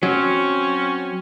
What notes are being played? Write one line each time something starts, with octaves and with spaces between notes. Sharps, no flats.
F#3 C4 C#4